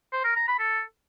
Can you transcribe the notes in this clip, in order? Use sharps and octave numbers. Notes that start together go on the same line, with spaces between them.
C5
A#4
A#5
B5
A4